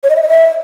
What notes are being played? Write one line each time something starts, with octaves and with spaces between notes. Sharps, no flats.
C#5
D#5
E5
D#5
E5